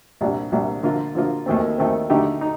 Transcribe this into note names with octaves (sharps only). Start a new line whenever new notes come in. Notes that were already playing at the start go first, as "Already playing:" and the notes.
C2 A#2 G3 D4
C2 A#2 G3 D4
D3 F3 A#3 F4
D3 F3 A#3 F4
D#2 D#3 A3 C4
D#2 D#3 A3 C4
D3 A3 D#4 G4
D#4